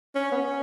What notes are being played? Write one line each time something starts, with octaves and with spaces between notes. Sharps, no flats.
C#4
B3
C#4